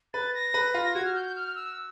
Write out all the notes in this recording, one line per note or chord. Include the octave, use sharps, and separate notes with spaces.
B4 A6
A#6
B4
F4
F#4 G#6
F6
G6
G6
F6
E6